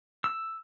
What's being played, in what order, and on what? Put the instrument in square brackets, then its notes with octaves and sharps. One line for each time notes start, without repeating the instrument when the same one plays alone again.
[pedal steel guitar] E6